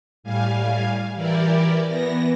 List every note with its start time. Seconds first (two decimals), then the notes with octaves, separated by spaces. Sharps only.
0.23 A2 G3 F5 G#5
1.15 E3 E4 G4 A#4 D5
1.87 E3 B3 A#6